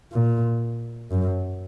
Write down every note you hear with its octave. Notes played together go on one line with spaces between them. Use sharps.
A#2
F#2